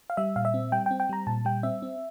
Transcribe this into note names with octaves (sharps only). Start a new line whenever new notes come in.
F5
G3 E5
A#2 F5
E5
C4
G3 G5
G5
C4
G5
G3 A#5
A#2 A5
G3 G5
C4 E5
C4